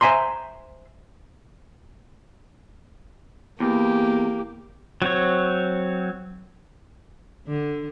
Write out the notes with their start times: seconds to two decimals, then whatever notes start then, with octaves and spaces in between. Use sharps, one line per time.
0.01 C5 E5 G#5 A#5 C6
3.60 E2 A#3 G4
5.02 F#3 C4 C#5
7.47 D3